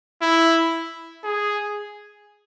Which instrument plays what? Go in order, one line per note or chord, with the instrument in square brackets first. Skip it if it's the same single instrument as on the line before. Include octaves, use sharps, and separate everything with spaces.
[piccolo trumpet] E4
G#4